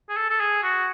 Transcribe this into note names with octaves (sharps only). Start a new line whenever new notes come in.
G#4
A4
A4
G#4
F#4